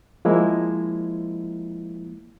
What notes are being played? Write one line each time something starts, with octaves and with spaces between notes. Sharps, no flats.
F3 G#3 A#3 E4